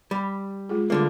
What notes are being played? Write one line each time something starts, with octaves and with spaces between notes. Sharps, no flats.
G3 B5
G#3 F4 G#4
D2 D3 G3 A#3 F4 G#4